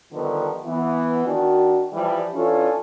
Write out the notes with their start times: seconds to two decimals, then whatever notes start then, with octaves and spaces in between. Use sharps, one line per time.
0.13 D3 D#3 F3 G3 B3
0.65 E3 B3
1.26 D#3 D4 F#4
1.93 E3 F3 G3
2.34 E3 C#4 D4 F4 A4